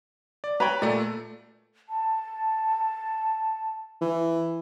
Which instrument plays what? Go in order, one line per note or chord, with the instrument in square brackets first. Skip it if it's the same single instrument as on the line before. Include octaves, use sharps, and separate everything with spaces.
[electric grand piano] D5
[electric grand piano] B4 C#5 G5 [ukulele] A#5 B5
[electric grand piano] A#2 A3 [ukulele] D5
[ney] A5
[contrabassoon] E3